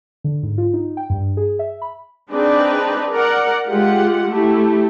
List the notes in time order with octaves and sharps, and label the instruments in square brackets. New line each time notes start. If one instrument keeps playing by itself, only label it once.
[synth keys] D3
G#2
F4
D#4
G5
G2
G#4
E5
B5
[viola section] C4 D4 D#4 G#4 B4 D5
A#4 D5 F#5
G#3 F4 G4 F#5
A3 E4 G4